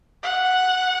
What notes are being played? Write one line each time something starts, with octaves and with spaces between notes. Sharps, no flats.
F#5